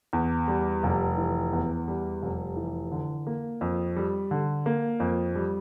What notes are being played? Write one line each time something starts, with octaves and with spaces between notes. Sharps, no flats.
E2
G3
F1
E3
E2
G3
F1
E3
D3
A#3
F2
G3
D3
A#3
F2
G3